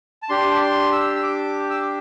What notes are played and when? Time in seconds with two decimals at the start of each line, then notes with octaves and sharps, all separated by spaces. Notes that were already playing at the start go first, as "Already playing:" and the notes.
0.23 A5
0.29 D4 G4 C6
0.51 A5
0.61 C6
0.92 E6
1.16 E6
1.23 D6
1.70 E6